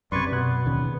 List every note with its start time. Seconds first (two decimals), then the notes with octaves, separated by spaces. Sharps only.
0.12 F#2 C3 B4 D5 C6 C#6 G#6
0.32 B2 B3 F#6
0.66 D#2 C#3